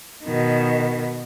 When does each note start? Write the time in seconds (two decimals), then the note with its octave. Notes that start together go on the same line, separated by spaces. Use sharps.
0.24 B2 D#3